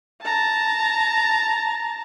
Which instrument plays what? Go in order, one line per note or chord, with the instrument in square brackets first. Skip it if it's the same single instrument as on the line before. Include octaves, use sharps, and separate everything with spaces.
[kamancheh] A5 A#5